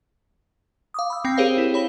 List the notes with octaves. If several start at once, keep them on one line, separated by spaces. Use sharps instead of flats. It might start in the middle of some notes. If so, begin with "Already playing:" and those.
F5 D6 D#6
B5 E6
C4 G5 A#6
G4 G#4 A#4 C5 C#5 F5
E4
C#5 B5 E7 G7